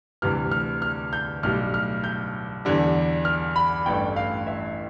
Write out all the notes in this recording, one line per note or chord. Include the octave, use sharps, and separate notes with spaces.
D2 C3 E3 G3 F6
F6
F6
G6
B1 A2 G3 F6
F6
G6
E2 D3 G3
F6
B5
A1 G2 E3 A3 G5
F5
E5